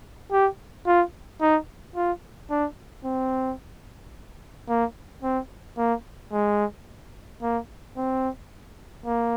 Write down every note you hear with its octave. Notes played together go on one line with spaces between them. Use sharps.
G4
F4
D#4
F4
D4
C4
A#3
C4
A#3
G#3
A#3
C4
A#3